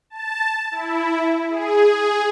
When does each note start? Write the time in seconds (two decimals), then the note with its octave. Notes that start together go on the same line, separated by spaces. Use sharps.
0.10 A5
0.71 E4
1.49 G#4